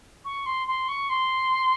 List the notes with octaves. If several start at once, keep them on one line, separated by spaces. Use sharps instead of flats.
C#6
C6
C6
C#6
C6